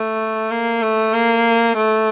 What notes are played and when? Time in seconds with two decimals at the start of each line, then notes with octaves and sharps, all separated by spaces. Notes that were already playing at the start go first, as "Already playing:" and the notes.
Already playing: A3
0.51 A#3
0.82 A3
1.14 A#3
1.77 A3